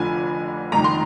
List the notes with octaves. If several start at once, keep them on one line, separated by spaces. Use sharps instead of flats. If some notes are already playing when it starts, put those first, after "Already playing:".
Already playing: F1 F2 D3 F3 G#5
F1 F2 D#3 G3 A#5
C6